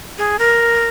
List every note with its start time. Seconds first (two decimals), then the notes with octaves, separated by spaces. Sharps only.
0.18 G#4
0.39 A#4